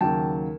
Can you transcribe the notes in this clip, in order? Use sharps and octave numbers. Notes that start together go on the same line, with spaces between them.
D#2 C#3 F#3 G5 A5